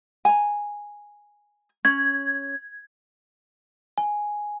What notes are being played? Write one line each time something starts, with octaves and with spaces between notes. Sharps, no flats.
G#5 A#5
C#4 G#6
G#5